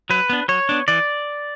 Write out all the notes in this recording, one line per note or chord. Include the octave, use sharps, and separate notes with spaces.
F#3 B4
B3 D4
F#3 C#5
B3 D4
E3 D5